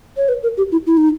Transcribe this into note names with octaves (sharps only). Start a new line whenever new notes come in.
C#5
B4
A#4
G4
E4
E4
D#4